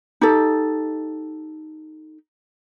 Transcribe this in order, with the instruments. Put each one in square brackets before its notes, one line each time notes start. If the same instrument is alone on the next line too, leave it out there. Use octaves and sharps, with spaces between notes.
[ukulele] D#4 G4 A4